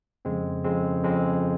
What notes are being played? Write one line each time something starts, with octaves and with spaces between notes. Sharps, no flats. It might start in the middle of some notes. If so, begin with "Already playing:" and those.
F2 C#3 G#3 C4
F2 C#3 G#3 C4
F2 C#3 G#3 C4